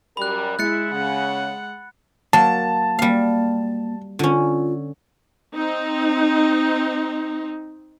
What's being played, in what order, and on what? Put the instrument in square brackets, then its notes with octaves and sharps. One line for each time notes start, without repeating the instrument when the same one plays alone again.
[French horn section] F#2 G3 A#4 [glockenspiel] B5 F#6
[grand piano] G#3 [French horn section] E4 [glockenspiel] F#6 A6 C#7
[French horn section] C#3 [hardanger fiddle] F#5
[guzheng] F#3 A#3 [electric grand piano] A5
[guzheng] G3 F5 [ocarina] A#3
[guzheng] D3 C#4 [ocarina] F4
[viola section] C4 D#4